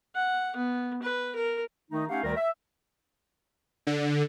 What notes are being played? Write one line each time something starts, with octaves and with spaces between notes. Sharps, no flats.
F#5
B3
B4
A#4
D#3 A3 D#4
A3 C#4 D#4 G4 F5 F#5
D2 D#3 G3 A#4
E5
D3